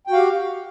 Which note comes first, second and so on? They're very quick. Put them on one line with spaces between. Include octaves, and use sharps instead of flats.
G5 F#4 F5 G4